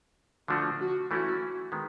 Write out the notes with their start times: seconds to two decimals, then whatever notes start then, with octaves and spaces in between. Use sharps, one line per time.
0.48 D3 F3 A3 D4 F4 F#4
0.80 F#4
1.11 E3 A3 C#4 E4 F#4
1.72 D#3 G#3 B3